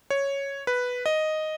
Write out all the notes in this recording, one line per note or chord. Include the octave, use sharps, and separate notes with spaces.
C#5
B4
D#5